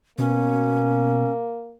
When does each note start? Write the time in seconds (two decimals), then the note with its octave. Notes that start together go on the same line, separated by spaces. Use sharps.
0.18 B2 A#3 C#4